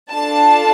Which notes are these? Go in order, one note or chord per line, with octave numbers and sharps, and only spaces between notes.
D4 F4 A4 A5